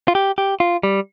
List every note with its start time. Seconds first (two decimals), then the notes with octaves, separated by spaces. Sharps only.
0.08 F4
0.15 G4
0.38 G4
0.60 F4
0.83 G3